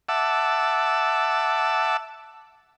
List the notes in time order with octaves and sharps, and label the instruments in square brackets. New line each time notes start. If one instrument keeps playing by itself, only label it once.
[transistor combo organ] E5 F#5 A5 D6 E6